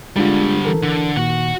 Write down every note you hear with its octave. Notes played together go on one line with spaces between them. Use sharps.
D3 G3 G#3 D4 F4
E3 A4 A#4
D3
A#2 D#3 F#4 F#5